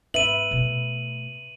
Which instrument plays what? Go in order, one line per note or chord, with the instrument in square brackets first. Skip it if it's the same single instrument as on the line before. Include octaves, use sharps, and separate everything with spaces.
[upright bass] G#1 [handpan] B4 E5 [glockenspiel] D#7 F#7
[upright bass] B2 A3